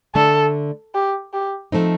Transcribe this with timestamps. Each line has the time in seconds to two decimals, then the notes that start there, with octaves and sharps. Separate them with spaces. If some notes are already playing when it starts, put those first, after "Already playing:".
0.15 D3 A3 D4 A4
0.94 G4
1.33 G4
1.72 F3 A3 C4 D#4